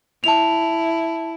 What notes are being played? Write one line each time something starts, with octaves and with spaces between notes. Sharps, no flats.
E4 A5 F7